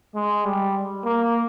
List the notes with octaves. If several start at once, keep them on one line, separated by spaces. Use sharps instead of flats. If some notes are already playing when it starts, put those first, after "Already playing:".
G#3
G3
A#3